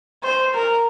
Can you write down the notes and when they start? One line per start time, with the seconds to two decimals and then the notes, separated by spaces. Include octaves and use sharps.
0.23 C5
0.54 A#4